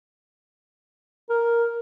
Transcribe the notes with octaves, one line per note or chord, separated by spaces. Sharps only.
A#4